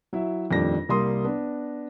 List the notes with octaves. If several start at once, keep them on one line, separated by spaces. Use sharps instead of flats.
F#3 E4 E5
D#1 F2 G3 A3 D4 A#6
C2 G3 A#3 C6 D#6
B3 D4 B4